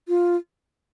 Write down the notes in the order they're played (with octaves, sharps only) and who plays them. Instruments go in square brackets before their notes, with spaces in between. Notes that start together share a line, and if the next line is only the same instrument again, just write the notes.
[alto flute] F4